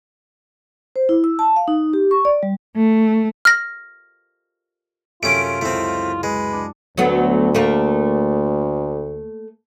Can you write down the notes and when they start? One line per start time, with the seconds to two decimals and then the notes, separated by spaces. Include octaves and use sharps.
0.96 C5
1.09 E4
1.24 E6
1.39 A5
1.56 F5
1.68 D#4
1.93 G4
2.11 C#6
2.25 D5
2.43 G3
2.76 A3
3.45 F6 A#6
5.23 F#2 C3 A3 C#4 F4 D7
5.61 C#2 A3 C4 E4
6.23 G#3 B4
6.53 D4 C#7
6.98 D2 F#3 A3 B3
7.55 A3 A#3